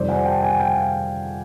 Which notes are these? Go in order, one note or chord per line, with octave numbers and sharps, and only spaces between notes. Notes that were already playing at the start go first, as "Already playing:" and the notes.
Already playing: F2 C3 D#3 G3 C5 D5
F#5 G#5
G5 A5
F#5 G#5
F5 G5